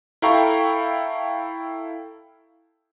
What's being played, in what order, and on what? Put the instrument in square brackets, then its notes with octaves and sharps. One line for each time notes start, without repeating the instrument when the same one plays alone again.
[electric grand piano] E4 A4 F5 G5 A#5 C#6